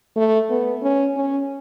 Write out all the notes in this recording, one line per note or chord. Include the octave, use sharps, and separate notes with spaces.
A3
B3
C#4
C#4